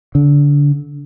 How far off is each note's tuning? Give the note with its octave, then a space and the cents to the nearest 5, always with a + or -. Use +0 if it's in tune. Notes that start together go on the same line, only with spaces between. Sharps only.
D3 -25